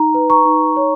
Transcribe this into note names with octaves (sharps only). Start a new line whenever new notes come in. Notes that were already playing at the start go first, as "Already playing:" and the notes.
Already playing: D#4 A#5
B4
A#5 C#6
D#4
C#5